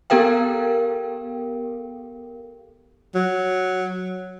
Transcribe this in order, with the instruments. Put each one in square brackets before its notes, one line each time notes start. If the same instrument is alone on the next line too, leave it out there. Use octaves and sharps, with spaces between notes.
[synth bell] B3 G4 A4 A#4 F5 G5
[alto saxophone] F#3